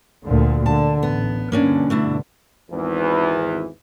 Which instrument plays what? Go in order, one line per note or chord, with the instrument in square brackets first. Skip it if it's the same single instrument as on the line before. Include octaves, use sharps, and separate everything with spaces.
[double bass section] D2 A#2 D3
[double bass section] D3 [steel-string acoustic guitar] A5
[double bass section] A1 [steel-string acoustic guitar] B3
[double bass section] G2 B2 D3 [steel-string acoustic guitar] A#3 C#4 D4
[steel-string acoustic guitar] A3 D4 E4
[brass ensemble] G#1 E2 E3